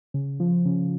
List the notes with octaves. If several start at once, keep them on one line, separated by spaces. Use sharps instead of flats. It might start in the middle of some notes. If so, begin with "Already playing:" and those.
C#3
F3
C#3